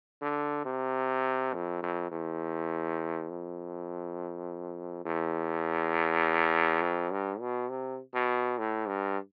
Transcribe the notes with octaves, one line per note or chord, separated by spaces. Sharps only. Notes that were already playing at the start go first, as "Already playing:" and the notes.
D3
C3
F2
F2
E2
F2
E2
F2
G2
B2
C3
B2
A2
G2